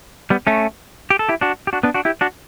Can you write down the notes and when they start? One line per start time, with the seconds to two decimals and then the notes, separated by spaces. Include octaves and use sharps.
0.30 G3 B3
0.47 A3 C#4
1.10 G4
1.19 A4
1.29 E4 G4
1.41 D4 F#4
1.67 G4
1.73 D4 F#4
1.83 B3 D4
1.94 D4 F#4
2.05 E4 G4
2.21 D4 F#4